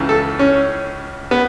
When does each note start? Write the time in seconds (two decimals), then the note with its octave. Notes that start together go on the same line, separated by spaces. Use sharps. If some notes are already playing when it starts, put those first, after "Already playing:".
Already playing: C#2 C#3 E3
0.09 A4
0.39 C#4
1.31 B3